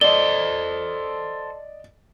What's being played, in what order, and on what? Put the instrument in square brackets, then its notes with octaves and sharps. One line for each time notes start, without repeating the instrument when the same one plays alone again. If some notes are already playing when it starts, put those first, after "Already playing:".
[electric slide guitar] A4 C5 [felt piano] D5 D#5 [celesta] G7